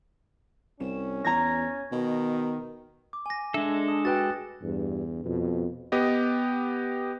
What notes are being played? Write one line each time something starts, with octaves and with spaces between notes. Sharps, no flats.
C2 C#4 E7
E2 A#5 G#6 A#6
B2 D#3
D6
G#5 A#6
G#3 D4 A4 E5
D#6
F#4 B4 G5 F#6 A6
E2 G2
F2 B2
B3 G4 D#5